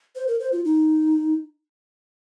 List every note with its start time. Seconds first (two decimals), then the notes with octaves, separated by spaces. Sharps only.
0.15 C5
0.28 A#4
0.40 C5
0.52 F4
0.65 D#4